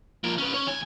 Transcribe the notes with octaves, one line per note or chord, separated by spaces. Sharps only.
F3 A#3
C#4 B4
C#4 C#5
D#2 G#5